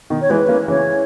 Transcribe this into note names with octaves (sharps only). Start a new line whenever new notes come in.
B2 D#3
C#5
E3 G#3 B4
A#3 C#4
C#3 E3 C#5